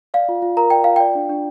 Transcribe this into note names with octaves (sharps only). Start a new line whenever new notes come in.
D5 F5
F4
F4
A#4 A#5
D5 G5
F4 F5
D5 G5
D4
D4